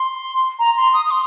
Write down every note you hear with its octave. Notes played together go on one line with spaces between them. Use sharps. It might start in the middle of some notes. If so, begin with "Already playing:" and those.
Already playing: C6
A#5
C6
D#6
D#6
C6